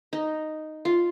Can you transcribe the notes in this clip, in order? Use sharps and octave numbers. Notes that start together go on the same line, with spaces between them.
D#4
F4